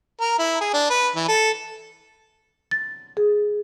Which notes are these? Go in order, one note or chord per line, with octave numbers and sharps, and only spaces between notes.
A#4
E4
G#4
D4
B4
E3
A4
A6
G#4